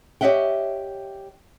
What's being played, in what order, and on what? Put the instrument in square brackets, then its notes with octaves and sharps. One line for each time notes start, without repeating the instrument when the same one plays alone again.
[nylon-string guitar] G4 C#5 D#5 E5 F#5 G5